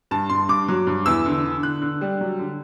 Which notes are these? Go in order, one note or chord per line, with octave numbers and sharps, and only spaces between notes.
G2 A5
G2 C6
G2 D6
F#3
G2
E2 E6
D3
D3
D3 F#6
D3
G3
F#3
D3